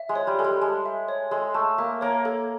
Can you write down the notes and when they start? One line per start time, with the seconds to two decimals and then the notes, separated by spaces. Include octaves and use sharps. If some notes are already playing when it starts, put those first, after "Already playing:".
Already playing: E5
0.09 G#3
0.16 C#5
0.27 G3
0.39 G#3 A4
0.44 G3
0.61 G#3 A5
0.86 E5
1.08 C#5
1.31 G#3 A4
1.54 A3 A5
1.78 A#3 E5
2.01 A#3 C#5
2.25 A4